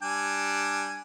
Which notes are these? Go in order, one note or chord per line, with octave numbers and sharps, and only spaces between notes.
G3 D4 G#5